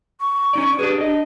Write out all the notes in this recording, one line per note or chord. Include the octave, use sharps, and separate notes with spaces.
C#6
C#4 D#4 D5
D4 G4 G#4 B4
D4 D#5